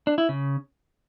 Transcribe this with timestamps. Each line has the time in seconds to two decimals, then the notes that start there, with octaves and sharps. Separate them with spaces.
0.07 D4
0.18 E4
0.29 C#3